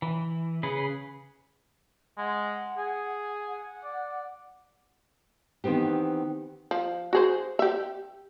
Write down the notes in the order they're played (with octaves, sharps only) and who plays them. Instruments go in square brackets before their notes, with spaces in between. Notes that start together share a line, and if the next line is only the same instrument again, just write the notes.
[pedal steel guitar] E3
C#3 G#4 B4
[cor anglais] G#3 [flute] F#5
[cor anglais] G#4
[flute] F#5
[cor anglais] D5
[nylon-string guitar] D#3 E3 B3 C4 G4
[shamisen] F3
F#4 G#4 C5
G4 E5